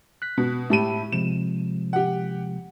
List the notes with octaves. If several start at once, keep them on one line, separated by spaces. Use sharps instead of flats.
F#6 B6
B2
A2 G4 E5 A5 B5 D#7
C3 F3 G#3 E7
G4 F#5